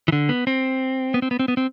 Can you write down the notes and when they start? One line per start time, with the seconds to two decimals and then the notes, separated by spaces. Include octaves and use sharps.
0.08 E3
0.12 D3
0.29 B3
0.47 C4
1.14 B3
1.22 C4
1.31 B3
1.39 C4
1.48 B3
1.57 C4